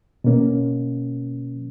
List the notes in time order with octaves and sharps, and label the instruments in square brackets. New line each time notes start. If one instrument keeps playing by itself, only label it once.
[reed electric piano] B2 A#3 C#4